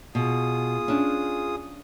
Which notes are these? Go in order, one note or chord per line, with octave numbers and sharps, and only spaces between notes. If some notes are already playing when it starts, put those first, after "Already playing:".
B2 F4 G#4 D#6
C#4 D4